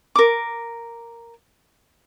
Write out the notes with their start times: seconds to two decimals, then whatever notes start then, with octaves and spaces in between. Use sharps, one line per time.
0.16 A#4 D6